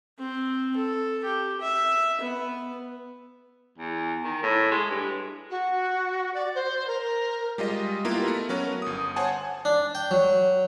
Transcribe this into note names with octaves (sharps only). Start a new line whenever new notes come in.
C4
A4
G4
E5
B3
E2
D#3
A2
G#3
G2
F#4
D5
C5
A#4
G3 G#3 F4 D#5
A#3 B3 E4 F4 G4 A#4
A3
F#3 B3 C#4 A#4
G1 D#6
C5 C#5 F#5 G#5 A5
D4
G5
F#3